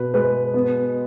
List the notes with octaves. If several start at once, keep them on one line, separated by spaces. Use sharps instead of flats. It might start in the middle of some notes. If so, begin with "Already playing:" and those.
Already playing: B2 B4
G#3 B4
B3